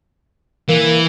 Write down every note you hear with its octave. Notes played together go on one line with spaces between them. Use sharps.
E3 A#3